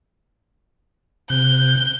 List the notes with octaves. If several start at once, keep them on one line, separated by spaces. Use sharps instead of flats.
C3 F#6 G6